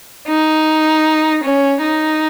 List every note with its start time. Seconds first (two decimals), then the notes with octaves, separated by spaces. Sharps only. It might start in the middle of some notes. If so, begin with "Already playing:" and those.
0.28 D#4
1.44 C#4
1.83 D#4